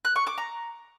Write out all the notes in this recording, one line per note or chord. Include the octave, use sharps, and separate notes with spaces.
F#6
C#6
D6
A#5